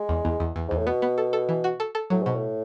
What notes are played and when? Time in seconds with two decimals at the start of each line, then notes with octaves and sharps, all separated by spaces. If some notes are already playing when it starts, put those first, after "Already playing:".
Already playing: G#3
0.09 E2
0.25 E2
0.40 E2
0.56 E2
0.68 E2 G#2
0.78 A2
0.87 B2 B3
1.02 B3
1.18 A4
1.33 A4
1.49 E3
1.64 F#4
1.80 A4
1.95 A4
2.10 A2 F#3
2.22 G#2 B2
2.36 A2